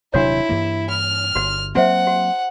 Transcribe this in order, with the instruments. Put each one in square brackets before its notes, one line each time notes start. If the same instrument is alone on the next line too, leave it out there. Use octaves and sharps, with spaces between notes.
[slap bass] D#1 C3 F#3 [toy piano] D4 F#4 C#5 [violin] E4
[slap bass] G2 E3 A#3
[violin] F6
[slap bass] G1 [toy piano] F#4
[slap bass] F#3 A#3 C4 [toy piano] F#4 C5 E5 [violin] F#5
[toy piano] F#4